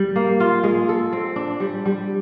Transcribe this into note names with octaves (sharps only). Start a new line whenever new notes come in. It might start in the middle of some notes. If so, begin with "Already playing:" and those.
Already playing: G3
A#3
F4
G#3
A4
C4
D4
G3
G3